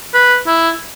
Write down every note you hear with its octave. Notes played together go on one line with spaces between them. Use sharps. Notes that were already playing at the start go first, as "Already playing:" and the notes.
B4
E4